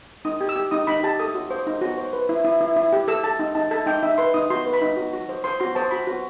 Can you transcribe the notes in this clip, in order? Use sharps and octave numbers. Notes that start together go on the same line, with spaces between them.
D#4 D#6
G4
E6
G4
D#4 D#6
D#4 B5
G4 A5
A4 D#6
F#4
C5
D#4
F#4
C5
B4
E4
E4
E4
E4
G4
A4 E6
A4 A5
D#4
D#4 A5
A4 A5
D#4 G5
D#4 E5
B4 C6
D#4 D#6
F#4 C6
B4
B5
D#4
F#4
F#4
C5
C5 C6
F#4 C6
C5 A5
F#4 B5
F#4